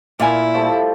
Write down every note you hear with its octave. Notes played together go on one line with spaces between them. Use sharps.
A#2 E4 D5 F5 G#5
F3 G3 A3